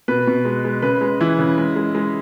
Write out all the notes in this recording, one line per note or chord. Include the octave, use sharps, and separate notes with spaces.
B2 B4
B2
G#3
G#3
C#3 B4
G#3
E3 E4
C#3
G#3
G#3
G#3